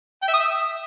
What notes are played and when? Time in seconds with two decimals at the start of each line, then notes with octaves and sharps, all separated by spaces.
0.22 G5
0.28 E5
0.34 D#6
0.40 E5